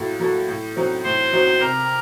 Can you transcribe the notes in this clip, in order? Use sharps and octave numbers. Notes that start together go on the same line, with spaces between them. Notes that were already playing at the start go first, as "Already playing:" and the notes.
Already playing: A2 F#3 A#3 F#4 A4
F#3 A#3 F#4 A4
A2
F#3 C4 D#4 F#4
A2 C5
F#3 C4 D#4 F#4
C3 A#4